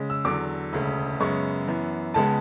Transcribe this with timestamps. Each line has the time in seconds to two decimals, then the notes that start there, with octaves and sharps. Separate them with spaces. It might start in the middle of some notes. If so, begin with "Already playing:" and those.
Already playing: C#3 G#3
0.10 E6
0.25 E2 D3 F#3 D6
0.73 E1 D2 C#3
1.20 F#2 C#3 G#3 B3 C#6
1.67 F#2 E3 B3
2.14 C#2 C#3 G#3 B3 A5